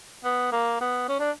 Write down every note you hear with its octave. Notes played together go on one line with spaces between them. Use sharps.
B3
A#3
B3
C#4
D4